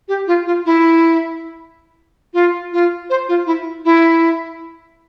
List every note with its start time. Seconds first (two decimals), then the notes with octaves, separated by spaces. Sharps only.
0.08 G4
0.27 F4
0.46 F4
0.66 E4
2.34 F4
2.73 F4
3.10 C5
3.28 F4
3.47 E4
3.85 E4